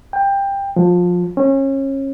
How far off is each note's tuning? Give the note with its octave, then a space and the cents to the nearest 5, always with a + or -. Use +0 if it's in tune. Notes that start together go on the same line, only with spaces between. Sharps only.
G5 +15
F3 +20
C#4 -30